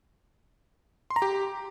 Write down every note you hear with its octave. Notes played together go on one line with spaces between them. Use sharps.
C6
A#5
G4